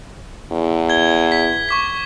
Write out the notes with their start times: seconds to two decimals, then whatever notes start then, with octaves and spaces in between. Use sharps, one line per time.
0.52 E2
0.89 G#6 G7
1.32 B6
1.69 C#6 D6 B6